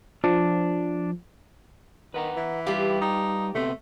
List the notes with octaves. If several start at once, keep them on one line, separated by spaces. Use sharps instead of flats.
F3 D4
D#3 B4 F#5 A#5
E3
G3 F4 G4 B4 F5
D#4
C3 A3 B3 C4